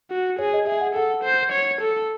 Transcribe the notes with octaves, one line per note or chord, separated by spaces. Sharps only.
F#4
G#4 C#5
D#5
G#4 E5
F#5
A4 F#5
C5
C#5
A4